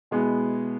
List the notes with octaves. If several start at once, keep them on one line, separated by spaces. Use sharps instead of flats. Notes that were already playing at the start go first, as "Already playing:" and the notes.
B2 G#3 B3 E4 G#4